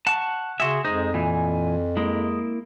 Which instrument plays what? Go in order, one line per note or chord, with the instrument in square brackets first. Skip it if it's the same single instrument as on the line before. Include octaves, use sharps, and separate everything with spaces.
[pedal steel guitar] F#5 C#6 [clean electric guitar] A5
[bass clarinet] C#3 [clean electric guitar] F#4 E5 [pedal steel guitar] G#4 C6
[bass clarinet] F2 [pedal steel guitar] G#3 G#4 C5 [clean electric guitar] D#4
[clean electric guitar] A#2 E3 [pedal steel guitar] G#5
[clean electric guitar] G#3 [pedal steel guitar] A#3 E4